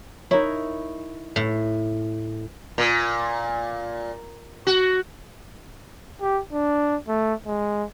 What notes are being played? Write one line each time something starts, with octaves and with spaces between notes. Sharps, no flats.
D#4 E4 A#4 C#5
A2
A#2
F#4
G4
D4
A3
G#3